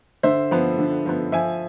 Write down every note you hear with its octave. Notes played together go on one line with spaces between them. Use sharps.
D3 C5 E5
F3 B3
D3
F3 B3
F3 E5 G#5